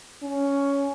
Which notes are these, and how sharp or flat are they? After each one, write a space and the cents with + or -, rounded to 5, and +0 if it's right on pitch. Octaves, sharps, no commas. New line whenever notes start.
C#4 +10